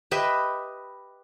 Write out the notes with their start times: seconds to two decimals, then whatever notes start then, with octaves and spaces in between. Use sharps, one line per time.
0.11 G4 B4 D#5 E5